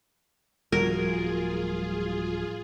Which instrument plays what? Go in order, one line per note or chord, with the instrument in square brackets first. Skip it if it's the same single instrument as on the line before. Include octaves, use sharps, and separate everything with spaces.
[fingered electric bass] D1 F3 [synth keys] G3 F#4 G#6 [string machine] F4 G#4 [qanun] A#4